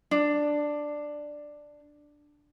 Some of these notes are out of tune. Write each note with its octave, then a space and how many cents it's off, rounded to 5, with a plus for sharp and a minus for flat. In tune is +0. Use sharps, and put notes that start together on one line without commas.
D4 +5